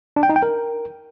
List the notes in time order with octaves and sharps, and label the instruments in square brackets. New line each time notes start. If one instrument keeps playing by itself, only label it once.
[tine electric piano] D4
G5
D#4
G5
A#4